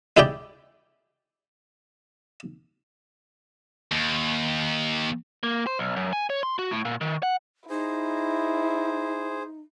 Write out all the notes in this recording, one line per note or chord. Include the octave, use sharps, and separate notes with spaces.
G#3 E4 G4 D5 G5
D#2
A#3
C5
B1
F#2
G#5
C#5
C6
F#4
A2
A#2
D#3
F#5
D#4 E4 G#4 C5